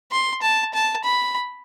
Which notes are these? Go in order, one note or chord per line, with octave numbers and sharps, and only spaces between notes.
C6
A5
A5
B5